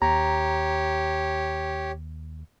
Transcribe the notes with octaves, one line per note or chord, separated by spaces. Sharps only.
D#2 G4 C#5 A#5